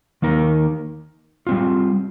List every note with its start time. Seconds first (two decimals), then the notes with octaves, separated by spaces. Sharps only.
0.22 D#3 A#3 D#4 A#4
1.47 G3 C4 F4